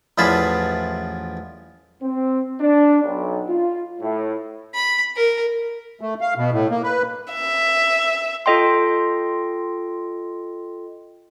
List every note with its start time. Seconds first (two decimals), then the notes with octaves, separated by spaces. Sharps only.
0.18 A1 E2 F3 G#4 A5 B5
2.02 C4
2.61 D4
3.04 B1
3.49 F4
4.01 A2
4.75 B5
5.16 A#4
6.01 A3
6.21 F5
6.37 B2
6.52 A2
6.70 A#3
6.83 B4
7.33 E5
8.46 F4 A4 D#5 G5 C6